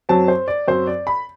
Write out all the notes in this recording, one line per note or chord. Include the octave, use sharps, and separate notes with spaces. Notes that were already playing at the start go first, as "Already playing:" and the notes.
F#2 F#3 C4 A5
C5
D5
F#2 F#3 C4 C5
D5
B5